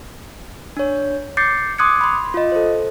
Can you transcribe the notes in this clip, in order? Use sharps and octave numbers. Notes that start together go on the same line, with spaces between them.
D4 C#5
D6 G6 A6 C7 C#7
C6 D6 D#6 F#6 G#6 C#7
B5 C6
F4 D#5
A4 C5